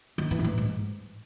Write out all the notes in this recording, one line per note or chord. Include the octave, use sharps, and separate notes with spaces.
D#3
E3
G#2
A2
G#2